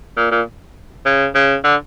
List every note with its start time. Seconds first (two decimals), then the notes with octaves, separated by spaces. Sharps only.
0.17 A#2
0.31 A#2
1.06 C#3
1.35 C#3
1.64 D3